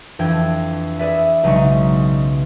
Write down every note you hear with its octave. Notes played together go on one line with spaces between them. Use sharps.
F2 E3 D4 G5 G#6
G#4 B4 D5 E5
B1 C#3 F#3 G#3 D#4 C#6